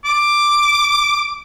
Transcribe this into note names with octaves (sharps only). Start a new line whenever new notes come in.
D6